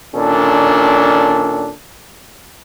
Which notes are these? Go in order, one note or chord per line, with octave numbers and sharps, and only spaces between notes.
A#2 D#3 C#4 D4 A4